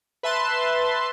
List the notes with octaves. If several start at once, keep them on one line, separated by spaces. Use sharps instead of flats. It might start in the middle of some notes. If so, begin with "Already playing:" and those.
B4 E5 A5 C6